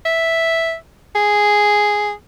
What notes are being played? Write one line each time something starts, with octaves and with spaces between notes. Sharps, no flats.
E5
G#4